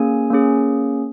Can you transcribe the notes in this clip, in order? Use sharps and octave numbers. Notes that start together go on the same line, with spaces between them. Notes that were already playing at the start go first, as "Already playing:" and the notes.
Already playing: A#3 C#4 G#4 G#5
A#3 C#4 G#4